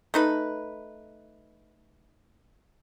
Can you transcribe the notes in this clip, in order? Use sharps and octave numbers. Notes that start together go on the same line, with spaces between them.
A3 D#4 B4